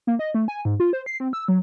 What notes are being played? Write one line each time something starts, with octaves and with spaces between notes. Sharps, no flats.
A#3
D#5
A3
G#5
G#2
F4
C5
C7
C4
E6
F#3